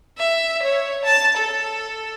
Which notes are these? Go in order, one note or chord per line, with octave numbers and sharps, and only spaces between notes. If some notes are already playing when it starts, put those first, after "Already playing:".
E5
C#5
A5
A4